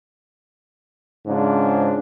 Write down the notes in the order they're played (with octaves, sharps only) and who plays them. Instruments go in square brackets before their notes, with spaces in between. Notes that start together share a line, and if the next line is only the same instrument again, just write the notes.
[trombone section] G#2 C#3 F3 D4